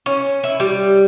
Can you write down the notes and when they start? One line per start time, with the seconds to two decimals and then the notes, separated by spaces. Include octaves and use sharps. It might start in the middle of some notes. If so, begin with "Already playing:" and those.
0.06 C#4
0.44 E4
0.60 G3